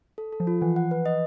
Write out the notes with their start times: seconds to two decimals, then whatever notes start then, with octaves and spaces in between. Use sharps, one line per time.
0.18 A4
0.33 A4
0.40 F3
0.47 F4
0.62 E3 F#5
0.76 F#5
0.91 B4
1.06 D#5